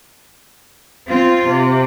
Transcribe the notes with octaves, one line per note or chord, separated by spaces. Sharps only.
C4 F4
C3